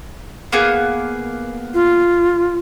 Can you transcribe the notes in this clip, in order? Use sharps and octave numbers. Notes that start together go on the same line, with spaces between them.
A#3 B3 G#4
F4